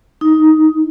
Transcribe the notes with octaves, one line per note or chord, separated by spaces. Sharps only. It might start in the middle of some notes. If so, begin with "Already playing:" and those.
D#4